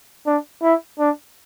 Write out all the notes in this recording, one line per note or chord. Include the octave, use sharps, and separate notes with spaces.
D4
E4
D4